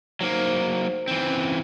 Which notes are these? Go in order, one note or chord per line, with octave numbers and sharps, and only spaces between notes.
F#3 A#3 D#4 C5
E3 C4
C#4